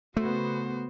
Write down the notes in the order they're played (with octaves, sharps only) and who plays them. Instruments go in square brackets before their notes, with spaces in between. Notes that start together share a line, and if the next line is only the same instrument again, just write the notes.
[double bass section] C#3 B3 [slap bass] A3 [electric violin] F#4 C5